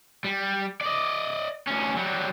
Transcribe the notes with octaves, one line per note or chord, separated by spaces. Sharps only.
G3
D5 D#5
D2 C#4
F#3 G3